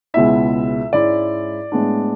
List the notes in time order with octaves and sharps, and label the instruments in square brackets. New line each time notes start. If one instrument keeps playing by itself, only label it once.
[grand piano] C#2 B2 G#3 B3 E4 E5
G#2 G#3 C#4 E4 D5
A2 G#3 B3 D4